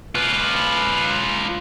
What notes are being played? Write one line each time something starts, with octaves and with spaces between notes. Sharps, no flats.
F4 B4